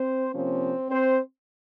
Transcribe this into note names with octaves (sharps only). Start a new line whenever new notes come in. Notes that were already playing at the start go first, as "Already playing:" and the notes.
Already playing: C4 C5
C3 F3 A#3 C4 C#4 C5
C4 C5